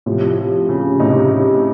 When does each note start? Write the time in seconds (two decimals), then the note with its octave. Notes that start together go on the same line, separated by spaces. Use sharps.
0.06 A2 C3 F3
0.38 F3
0.69 C#3
1.00 A2 C3 D#4